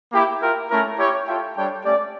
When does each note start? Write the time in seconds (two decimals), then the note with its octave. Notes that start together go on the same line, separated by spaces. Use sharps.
0.12 A#3 E4 G4
0.41 F4 A#4 E5 G5
0.70 A3 C#4 E4 A#4
0.98 E4 G4 C#5
1.27 F4 A4 E5 G5
1.55 G3 D4 A4 C#5 G5
1.85 A3 C#4 G4 D5